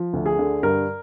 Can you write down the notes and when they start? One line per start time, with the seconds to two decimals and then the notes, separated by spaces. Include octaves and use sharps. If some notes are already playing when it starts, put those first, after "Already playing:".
Already playing: F3
0.13 D2
0.26 G#4
0.39 D3
0.63 G2 A#4